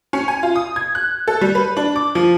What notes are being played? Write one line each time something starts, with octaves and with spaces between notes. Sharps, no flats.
C#4
G#5
F4
D#6
G#6
F#6
A4
G3
B4
D4
D6
F3